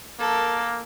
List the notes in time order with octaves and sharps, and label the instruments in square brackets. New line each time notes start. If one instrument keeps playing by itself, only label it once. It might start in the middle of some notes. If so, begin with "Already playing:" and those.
[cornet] A#3 [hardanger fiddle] A4 A#4